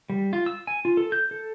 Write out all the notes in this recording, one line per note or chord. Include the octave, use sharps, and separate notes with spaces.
G3
F4
E6
G#5
F4
A4
G6
A4